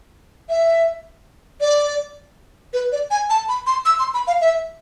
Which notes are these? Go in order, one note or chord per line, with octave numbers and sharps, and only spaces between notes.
E5
D5
B4
D5
G#5
A5
B5
C6
E6
C6
B5
F5
E5